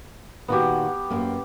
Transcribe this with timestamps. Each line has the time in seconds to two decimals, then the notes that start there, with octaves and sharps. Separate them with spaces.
0.48 A#2 D#3 B3 F#4 G4
1.10 F#2 A#3